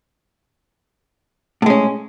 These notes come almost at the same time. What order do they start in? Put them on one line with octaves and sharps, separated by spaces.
A2 G#3 C#4